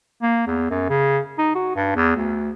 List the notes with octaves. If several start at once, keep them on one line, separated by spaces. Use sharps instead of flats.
A#3
E2
F#2
C#3
D#4
F#4
G2
E2
D2